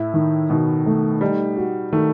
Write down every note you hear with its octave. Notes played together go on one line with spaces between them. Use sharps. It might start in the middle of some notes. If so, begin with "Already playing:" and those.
Already playing: A2 E4
D#3
B2 D#3
A3
G3 D#4
F#4
D#3 A3